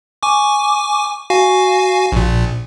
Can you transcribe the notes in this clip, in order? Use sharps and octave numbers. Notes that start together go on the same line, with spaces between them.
G#5 C#6 D6
F#4 F5 G#5
A#1 A#2